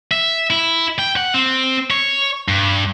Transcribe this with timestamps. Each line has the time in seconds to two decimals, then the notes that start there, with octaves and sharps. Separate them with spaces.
0.11 E5
0.50 E4
0.99 G5
1.16 F#5
1.34 C4
1.91 C#5
2.48 G2